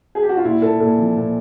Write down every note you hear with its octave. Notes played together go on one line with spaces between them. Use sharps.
G#4
G4
F#4
F4
A#2 E4
A#2 A4
A#2 A4
F3
A#2